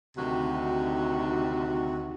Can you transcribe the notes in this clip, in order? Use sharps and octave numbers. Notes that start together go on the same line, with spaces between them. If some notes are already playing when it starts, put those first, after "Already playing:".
D2 C3 D#3 D#4 F#4